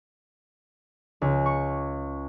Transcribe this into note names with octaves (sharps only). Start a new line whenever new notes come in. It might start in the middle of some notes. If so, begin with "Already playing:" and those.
C#2
C#6